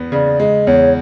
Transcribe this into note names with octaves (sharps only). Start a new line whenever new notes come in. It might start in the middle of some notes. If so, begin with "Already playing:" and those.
Already playing: E2 B3
C#3 D5
G#3 D#5
E2 C#5